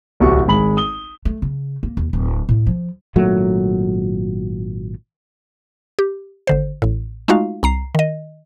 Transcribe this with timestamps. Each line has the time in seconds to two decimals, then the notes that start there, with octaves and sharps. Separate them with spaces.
0.20 D1 C2 F#4 G4 C#6
0.47 G#1 G#3 B5 F#7
0.77 D#6 G7
1.25 A3
1.42 C#3
1.83 A#3
1.97 D#2
2.13 D1
2.49 A2
2.67 F3
3.16 G#1 A#2 F#3 A3
5.99 G4
6.47 G#1 D3 C5
6.82 A1 A2
7.28 G#3 A3 D#4 F4 F#4 F5
7.63 C2 A#5 C7
7.95 D#3 D#5